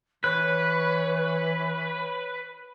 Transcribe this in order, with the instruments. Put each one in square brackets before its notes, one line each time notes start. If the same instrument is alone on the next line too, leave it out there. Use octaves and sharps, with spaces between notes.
[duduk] E3 [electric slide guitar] B4 [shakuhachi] C#5 [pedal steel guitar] F#6